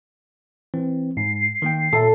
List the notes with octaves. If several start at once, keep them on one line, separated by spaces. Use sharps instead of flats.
E3 C4
G#2 C7
D#3 A#3 G5
A#2 A4 E5